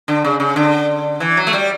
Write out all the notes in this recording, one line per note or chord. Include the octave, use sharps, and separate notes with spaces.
D3
C#3
C#3
D3
E3
F#3
A3
G3